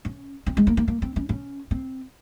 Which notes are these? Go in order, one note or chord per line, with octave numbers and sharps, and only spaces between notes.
C#4
C4
G#3
A#3
A#3
A#3
C4
C#4
C#4
C4